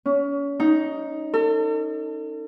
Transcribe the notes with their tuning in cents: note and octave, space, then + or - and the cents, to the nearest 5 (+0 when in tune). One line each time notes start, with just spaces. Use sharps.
C#4 +30
D#4 +5
A4 +40